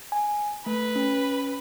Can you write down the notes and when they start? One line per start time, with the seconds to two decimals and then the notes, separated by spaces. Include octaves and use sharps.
0.12 G#5
0.66 A3 B4
0.96 C#4